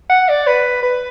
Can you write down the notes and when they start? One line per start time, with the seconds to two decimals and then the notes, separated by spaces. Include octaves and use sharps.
0.09 F#5
0.29 D5
0.47 B4
0.83 B4